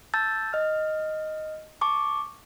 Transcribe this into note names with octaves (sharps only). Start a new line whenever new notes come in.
A5 E6 G6 A6
D#5 F6
A5 C#6 D6